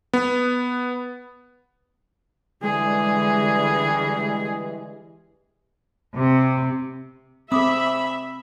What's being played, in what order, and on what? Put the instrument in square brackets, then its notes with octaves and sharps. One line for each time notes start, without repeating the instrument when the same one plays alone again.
[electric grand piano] B3
[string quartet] D3 [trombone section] E3 G3 [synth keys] G#3 [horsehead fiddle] G#4
[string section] C3
[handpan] C4 [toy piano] G#4 D6 D#6 [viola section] E5 [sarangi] B5